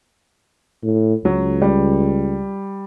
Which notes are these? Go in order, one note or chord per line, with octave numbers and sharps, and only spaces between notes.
A2
C#2 F#3
G3